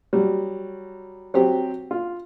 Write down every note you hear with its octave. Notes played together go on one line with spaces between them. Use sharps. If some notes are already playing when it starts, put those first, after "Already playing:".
F#3 G3
F#3 C4 G4
F4